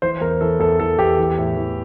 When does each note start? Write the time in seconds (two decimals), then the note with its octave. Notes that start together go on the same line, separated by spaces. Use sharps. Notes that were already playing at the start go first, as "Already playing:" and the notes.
0.02 E3 C5
0.21 E2 A#4
0.41 E3 A4
0.60 E2 A4
0.80 E3 A4
0.98 E2 G4
1.19 E3
1.38 A2
1.57 E3